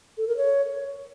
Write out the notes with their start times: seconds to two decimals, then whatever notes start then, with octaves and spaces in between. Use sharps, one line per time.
0.18 A4
0.27 A#4
0.37 C#5